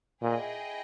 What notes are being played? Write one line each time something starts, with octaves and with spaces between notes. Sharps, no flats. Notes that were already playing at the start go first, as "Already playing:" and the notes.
A#2 E4 G#4 D#5 G5